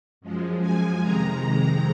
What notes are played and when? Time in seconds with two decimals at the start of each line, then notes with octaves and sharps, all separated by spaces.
0.21 F#2 F3 G#3
0.61 G#5
1.02 F2 C3 D#3 G#3 A#5